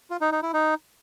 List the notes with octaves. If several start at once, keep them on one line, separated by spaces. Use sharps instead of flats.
F4
D#4
D#4
E4
D#4